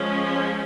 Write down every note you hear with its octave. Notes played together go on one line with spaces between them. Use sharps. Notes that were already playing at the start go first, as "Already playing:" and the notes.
Already playing: F3 G#3 C#4